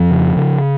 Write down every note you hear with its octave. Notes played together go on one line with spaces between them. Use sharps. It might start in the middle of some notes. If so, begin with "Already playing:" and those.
Already playing: F2 F3
C#3
C#3